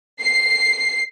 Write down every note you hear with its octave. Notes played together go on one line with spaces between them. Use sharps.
C7